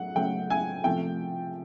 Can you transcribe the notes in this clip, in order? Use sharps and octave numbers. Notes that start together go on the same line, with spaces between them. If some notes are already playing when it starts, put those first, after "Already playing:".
Already playing: F#3 F#5
C#3 F#3 A3 G5
G#5
C3 F3 A3 G5